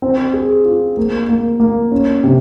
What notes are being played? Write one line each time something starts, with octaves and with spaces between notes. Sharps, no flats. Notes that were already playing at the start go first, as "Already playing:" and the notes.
C4
G#4
F4
A#3
A#3
A#3
C#4
C3